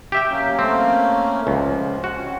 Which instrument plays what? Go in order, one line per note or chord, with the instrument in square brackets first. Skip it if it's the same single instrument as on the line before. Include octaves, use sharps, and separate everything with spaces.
[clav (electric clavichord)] G4 E5 G5
[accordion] F#3 A#3 C#4
[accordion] A3 A#3 C#4 [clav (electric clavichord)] C4
[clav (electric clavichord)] C#2 [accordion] F3
[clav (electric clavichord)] F#4
[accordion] C4 C#4